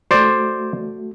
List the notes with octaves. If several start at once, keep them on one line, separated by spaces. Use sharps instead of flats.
A3 F#4 C5 D5